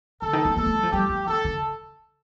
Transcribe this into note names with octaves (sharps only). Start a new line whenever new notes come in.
D3 A4
D#3
C4
A#3 A4
A3
G3
F3
G3 G4
F3
D#3 A4
D3